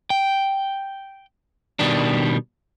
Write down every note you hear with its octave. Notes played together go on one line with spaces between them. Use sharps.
G5
B2 D#3 G3 D4